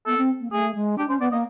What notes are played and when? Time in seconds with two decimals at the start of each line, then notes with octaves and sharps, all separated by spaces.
0.06 B3 A4
0.17 C4
0.40 A#3
0.51 A3 G#4
0.75 G#3
0.98 D4 G4
1.09 C#4 C5
1.20 B3 D5
1.31 A#3 D#5